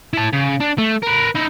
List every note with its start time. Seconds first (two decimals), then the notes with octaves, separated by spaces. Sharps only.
0.13 E4 A5
0.33 C#3
0.61 D4
0.78 A3
1.02 A#4 B4
1.35 D#4 E4